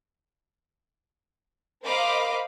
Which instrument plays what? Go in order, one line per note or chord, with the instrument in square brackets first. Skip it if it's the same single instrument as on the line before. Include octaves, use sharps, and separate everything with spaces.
[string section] A#4 C5 D#5 F5 B5 D6